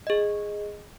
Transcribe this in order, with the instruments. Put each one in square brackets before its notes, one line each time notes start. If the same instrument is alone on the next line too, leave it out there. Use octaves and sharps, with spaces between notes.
[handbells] G#4 D#5